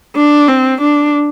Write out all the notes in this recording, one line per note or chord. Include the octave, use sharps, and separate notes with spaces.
D4
C4
D4